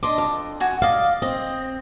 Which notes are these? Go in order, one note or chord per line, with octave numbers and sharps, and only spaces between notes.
D4 D#5 C6 D6
F2
F#4 G#5
D5 D#5 F5
C4 D#5